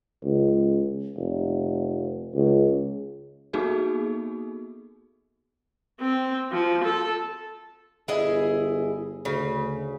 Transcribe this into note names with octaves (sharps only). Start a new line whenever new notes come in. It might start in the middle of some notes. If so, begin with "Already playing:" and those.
C#2
F1
C#2
A#3 B3 D#4 F#4 G#4 A4
C4
F3
A4
G1 E4 G#4 D#5
D2 C#3